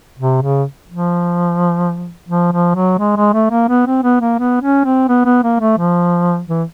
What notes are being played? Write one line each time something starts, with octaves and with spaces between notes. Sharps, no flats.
C3
C#3
F3
F3
F3
F#3
G#3
G#3
A3
A#3
B3
C4
B3
A#3
B3
C#4
C4
B3
B3
A#3
A3
F3
E3